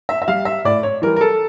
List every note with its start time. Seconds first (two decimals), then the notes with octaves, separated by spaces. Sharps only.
0.09 E5
0.22 E5
0.28 G3 F5
0.45 E5
0.65 A2 D5
0.83 C#5
1.02 E3 G3 A#4
1.16 A#4
1.21 A4